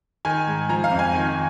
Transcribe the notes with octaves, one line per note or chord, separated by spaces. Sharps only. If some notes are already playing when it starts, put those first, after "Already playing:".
D#3 G#5
G#2
F3 A#5
F5
F2
G#5
D#3